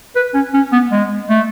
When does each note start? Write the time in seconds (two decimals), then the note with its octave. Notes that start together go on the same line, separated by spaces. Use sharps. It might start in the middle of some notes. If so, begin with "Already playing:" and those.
0.16 B4
0.34 C#4
0.54 C#4
0.72 B3
0.92 G#3
1.30 A3